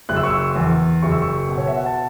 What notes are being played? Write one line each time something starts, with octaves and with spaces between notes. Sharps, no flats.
F#1 F#6
E6
C#6
E6
E2
F#1 C#6
E6
C#6
B2
C#5
E5
F#5
A5